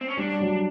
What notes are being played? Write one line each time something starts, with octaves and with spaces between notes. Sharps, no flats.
C4
C#4
G3 D4
F#3